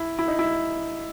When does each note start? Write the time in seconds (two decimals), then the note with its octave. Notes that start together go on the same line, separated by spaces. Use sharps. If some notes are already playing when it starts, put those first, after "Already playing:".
Already playing: E4
0.19 E4
0.28 D#4
0.39 E4